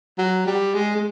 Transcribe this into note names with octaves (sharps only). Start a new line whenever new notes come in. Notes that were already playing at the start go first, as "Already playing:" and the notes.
F#3
G3
G#3
G#3